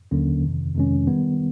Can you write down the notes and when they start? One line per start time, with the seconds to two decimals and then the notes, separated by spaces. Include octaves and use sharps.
0.11 D#2 D3 F#3 A#3 C#4
0.43 F2 C3 D#3
0.75 F2 C3 D#3 G#3 C#4
1.07 D#3 G3 B3